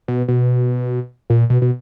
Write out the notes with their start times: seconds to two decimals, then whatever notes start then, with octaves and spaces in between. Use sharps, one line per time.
0.08 B2
0.28 B2
1.30 A#2
1.50 B2
1.62 B2